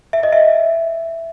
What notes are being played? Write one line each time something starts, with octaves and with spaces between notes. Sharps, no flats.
E5
D#5
E5